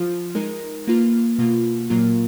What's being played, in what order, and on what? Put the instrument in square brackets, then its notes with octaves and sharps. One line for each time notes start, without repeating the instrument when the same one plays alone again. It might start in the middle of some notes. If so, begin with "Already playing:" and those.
Already playing: [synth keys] F3 F4
G#3 D#4 A#4
A#3 F4 B4
B2 A#3 F4
A#2 F#3 A#3 F4 A#4